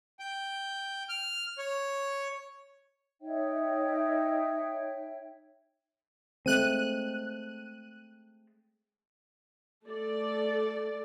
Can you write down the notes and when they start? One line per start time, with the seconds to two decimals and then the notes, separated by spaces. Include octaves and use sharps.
0.19 G5
1.09 F6
1.58 C#5
3.22 D#4 C#5 E5 G5
6.46 G#3 A3 C4 F#6 D#7
9.85 A3 A4 D5